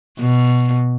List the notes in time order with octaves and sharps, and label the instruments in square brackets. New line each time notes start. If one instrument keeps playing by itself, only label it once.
[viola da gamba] B2